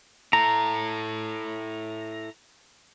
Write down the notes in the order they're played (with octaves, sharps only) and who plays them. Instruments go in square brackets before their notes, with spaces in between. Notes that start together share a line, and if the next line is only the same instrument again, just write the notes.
[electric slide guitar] E4 A4 [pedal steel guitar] A#5